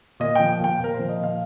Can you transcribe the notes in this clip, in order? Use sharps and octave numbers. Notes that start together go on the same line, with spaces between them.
A#2 D#5
F3 G5
A#2 G5
A#2 A#4
C5
F3
D#5
A#2 F5